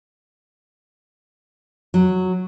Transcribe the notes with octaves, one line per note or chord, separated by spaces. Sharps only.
F#3